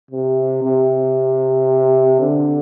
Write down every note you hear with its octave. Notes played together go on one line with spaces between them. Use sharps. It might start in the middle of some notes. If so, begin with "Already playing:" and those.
C3
C3
D3